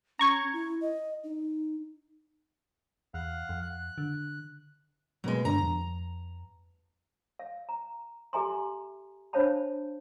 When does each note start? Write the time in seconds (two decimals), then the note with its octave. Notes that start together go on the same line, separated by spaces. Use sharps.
0.19 C#4 A#5 C#6 G#6
0.53 E4
0.81 D#5
1.24 D#4
3.14 E2 F5 F#5
3.49 F2
3.62 F#6
3.98 D3
5.24 B2 F#3 G#3 A#3 B3
5.45 G2 D3 D4 A#5
5.63 F2
7.39 F5
7.69 A#5
8.33 G4 A4 E5 G#5 A#5 C6
9.33 D4 C5 C#5 F5 A5 B5